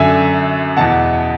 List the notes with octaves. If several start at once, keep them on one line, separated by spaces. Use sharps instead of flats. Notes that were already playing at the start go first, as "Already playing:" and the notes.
Already playing: F#2 D3 E5 G#5
E2 B2 F#5 A5